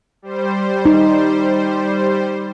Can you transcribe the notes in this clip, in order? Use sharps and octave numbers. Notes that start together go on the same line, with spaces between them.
G3 C5
D#4